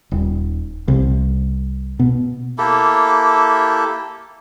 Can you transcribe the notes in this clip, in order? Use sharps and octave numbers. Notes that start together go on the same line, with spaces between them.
D#1
C2
B2
A#3 E4 G4 A4